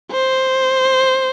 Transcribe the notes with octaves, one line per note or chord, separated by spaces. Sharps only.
C5